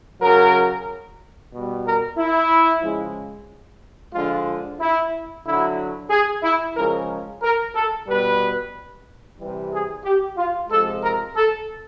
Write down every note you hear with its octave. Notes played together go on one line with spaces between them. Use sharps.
C#3 F#3 A#4
B2 G3
A#4
E4
C#3 F3 G#3
D3 F3 G#3 F4
E4
D3 F#3 E4
G#4
E4
C#3 F3 G#3 A#4
A#4
A4
B2 G3 B4
C3 E3 G3
G#4
G4
F4
C3 F3 G#3 A4
A#4
A4